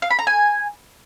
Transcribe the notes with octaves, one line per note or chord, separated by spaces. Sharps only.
F5
B5
A#5
G#5